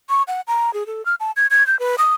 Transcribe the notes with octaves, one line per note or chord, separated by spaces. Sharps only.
C#6
F#5
A#5
G#4
A4
F6
A5
G#6
G#6
G6
B4
D#6